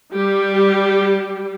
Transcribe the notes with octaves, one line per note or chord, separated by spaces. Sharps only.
G3 G4